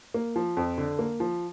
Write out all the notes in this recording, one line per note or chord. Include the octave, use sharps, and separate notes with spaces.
A#3
F3
F2
D3
A#3
F3